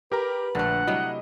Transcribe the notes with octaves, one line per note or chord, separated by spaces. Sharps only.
G4 A#4 B4 A#5
A#1 D3 A3 F#5
C3 F#3 G3 E4 D#5